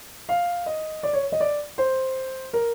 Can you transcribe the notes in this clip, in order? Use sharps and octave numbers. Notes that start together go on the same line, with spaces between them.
F5
D#5
D5
C#5
D#5
D5
C5
A#4